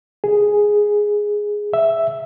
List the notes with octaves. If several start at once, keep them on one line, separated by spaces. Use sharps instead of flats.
G#4
E5